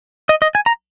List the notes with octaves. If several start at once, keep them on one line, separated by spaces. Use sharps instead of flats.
D#5
D#5
G#5
A#5